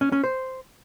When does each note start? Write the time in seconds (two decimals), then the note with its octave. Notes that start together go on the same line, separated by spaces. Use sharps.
0.01 C#4
0.12 C#4
0.24 C5